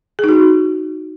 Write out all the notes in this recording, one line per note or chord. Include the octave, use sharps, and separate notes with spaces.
D#4 F#4 G#4